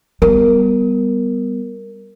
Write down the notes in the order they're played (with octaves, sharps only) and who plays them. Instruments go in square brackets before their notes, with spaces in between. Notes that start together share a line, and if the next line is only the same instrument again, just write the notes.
[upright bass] G3 B3 [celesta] A#4